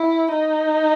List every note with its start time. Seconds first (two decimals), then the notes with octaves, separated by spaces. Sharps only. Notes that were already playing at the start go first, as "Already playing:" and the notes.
Already playing: E4
0.31 D#4